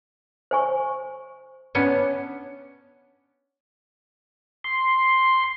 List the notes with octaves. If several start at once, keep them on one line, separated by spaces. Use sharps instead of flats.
C5 G#5 C#6
B3 C#4 D4
C6